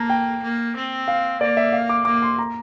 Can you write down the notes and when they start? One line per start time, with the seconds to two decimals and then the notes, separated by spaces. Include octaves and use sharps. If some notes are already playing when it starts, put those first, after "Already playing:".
Already playing: A#3 A5 A#5
0.10 G5
0.43 A#3
0.76 C4
1.08 F5
1.41 A#3 D5
1.57 E5
1.72 F5
1.89 D6
2.05 A#3 D6
2.22 C6
2.39 A#5